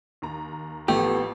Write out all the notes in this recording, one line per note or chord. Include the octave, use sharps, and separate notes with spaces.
D#2 A#5
A1 F3 A3 B3 G4